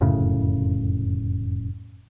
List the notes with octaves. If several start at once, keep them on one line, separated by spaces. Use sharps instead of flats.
F1 F#2 A2 C#3